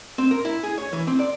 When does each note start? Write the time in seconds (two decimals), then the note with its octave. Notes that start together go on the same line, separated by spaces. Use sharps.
0.18 C4
0.31 A#4
0.45 E4
0.63 G#4
0.78 C#5
0.93 E3
1.07 C4
1.19 D5